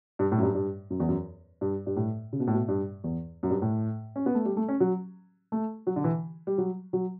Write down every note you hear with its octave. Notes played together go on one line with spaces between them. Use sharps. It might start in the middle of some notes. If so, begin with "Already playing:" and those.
G2
A2
F#2
G2
G2
F#2
E2
F#2
G2
G2
A2
C#3
B2
A2
B2
G2
E2
F#2
G2
A2
C#4
B3
A3
G3
A3
C#4
F#3
A3
F#3
D3
E3
G3
F#3
F#3